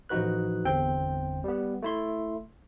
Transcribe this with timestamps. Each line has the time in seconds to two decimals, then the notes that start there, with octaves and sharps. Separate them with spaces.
0.09 A1 F3 D#4 F#4 B4 F#6
0.65 G1 E2 C4 G5 G6
1.44 G3 B3
1.82 A3 E4 C6